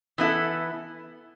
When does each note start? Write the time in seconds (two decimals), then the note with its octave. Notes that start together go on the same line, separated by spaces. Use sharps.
0.18 E3 B3 E4 A4